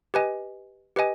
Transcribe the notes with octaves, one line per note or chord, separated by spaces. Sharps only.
G4 B4 D#5 G#5
G4 B4 D#5 G#5